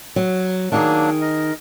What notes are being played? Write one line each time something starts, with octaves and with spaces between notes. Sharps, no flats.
F#3
D#3 F#3 A#3 D4 D#4 G#4
A#4 D#5